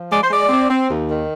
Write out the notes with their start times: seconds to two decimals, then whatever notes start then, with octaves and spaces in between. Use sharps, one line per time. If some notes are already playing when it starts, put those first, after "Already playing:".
Already playing: F3
0.10 G#3 D5
0.22 C5
0.30 G#3 D5
0.49 C4
0.68 C4
0.89 D#2
1.08 D#3